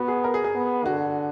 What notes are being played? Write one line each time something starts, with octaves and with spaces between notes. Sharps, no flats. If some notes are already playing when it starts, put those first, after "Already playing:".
Already playing: B3 F#4
G#4
A#4
G#4
G#4
B3
D3 F#4